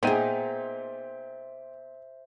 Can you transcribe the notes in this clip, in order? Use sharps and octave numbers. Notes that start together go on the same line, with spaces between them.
A#2 B3 D#4 G#4 C5 E5 G5 D#7